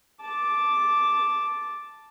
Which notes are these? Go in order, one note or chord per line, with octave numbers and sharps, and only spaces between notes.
A5 D6